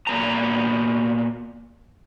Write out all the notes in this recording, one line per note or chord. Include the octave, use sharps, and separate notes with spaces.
A#2 B3 A#5